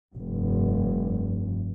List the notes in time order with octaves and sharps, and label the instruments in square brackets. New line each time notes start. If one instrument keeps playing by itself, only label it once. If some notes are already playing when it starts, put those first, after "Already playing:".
[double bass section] F1 G2